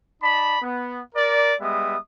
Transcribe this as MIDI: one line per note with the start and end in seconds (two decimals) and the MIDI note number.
0.22 0.56 63
0.22 0.56 74
0.22 0.56 81
0.22 0.56 83
0.62 1.00 59
1.15 1.54 70
1.15 1.54 74
1.60 1.96 55
1.60 1.96 56
1.60 1.96 59
1.60 1.96 76
1.60 1.96 87